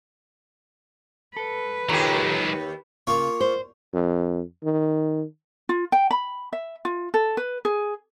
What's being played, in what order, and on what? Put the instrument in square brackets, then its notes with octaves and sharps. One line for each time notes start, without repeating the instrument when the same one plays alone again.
[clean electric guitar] A4 [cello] B4
[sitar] D#2 G4 [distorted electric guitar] F#3 G#3 [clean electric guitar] F4 A4 A#5
[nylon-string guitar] C#3 [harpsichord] A#3 F4 C#5
[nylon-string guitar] C5
[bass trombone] F2
D#3
[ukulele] F4
G5
B5
E5
F4
A4
B4
G#4